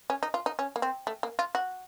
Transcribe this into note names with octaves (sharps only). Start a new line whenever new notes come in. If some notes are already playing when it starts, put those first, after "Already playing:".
C#4
D#4
F4
D#4
C#4
A#3
C4
A3
A#3
F4
F#4